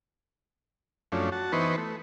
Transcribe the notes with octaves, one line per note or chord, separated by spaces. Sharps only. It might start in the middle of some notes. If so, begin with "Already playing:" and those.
F#2 F3 A3 C#4 D4
F#4 A5
E3 B3 D#4 B4 C5 C#6
A3